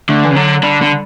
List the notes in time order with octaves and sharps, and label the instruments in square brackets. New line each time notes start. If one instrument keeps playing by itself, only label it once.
[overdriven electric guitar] D3 [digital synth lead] A3
[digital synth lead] E3
[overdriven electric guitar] C#3
[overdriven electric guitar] D3 [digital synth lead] F#3
[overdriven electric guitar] D3 [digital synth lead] G3
[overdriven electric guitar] D3